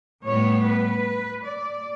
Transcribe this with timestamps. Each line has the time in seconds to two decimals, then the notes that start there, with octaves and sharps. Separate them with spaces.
0.24 A2 G3 B3 C#5
0.63 B4
1.42 D5